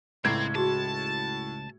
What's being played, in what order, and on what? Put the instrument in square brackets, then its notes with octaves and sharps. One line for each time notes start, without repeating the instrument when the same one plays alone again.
[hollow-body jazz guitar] C#2 [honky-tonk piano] A2 G#6 [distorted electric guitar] C4 [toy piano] B4 A#5 D6
[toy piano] F#4 G#4 [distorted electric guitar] A5